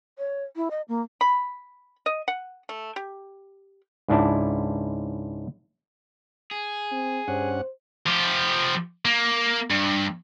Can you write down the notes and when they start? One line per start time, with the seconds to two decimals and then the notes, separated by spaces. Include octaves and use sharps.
0.18 C#5
0.56 E4
0.71 D#5
0.88 A#3
1.21 B5
2.06 D#5
2.28 F#5
2.69 A3
2.96 G4
4.08 C#2 G#2 D4 E4 A5
6.51 G#4
6.92 C4
7.28 G2 C#4 C5 F#5
8.06 F3 G4
9.05 A#3
9.70 G2